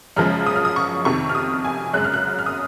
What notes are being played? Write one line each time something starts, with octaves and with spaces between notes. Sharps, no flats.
F#2 C#3 F3 G#3 F6
D#6
F6
D#6
C#6
F2 C3 D#3 C#6
F6
D#6
G#5
F#2 C#3 G#3 F#6
F6
F#6
F6
D#6